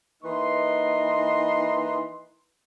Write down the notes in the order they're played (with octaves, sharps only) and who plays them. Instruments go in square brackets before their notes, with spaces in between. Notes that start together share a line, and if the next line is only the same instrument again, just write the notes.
[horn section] E3 A#3 D#4 B4 D#5 C6